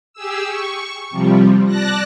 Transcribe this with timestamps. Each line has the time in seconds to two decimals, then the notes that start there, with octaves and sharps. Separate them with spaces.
0.13 G4 G#4 E6
0.47 C#6
1.10 C3 F3 G3
1.66 D5 A5 F#6 A#6